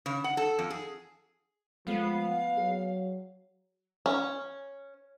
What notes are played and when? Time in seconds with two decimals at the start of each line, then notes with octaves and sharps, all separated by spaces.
0.06 C#3
0.24 F#5
0.37 A4
0.59 F2
0.70 G#4
1.87 F3 G#3 A3 B3 F5
2.57 F#3 G#4
4.06 C#4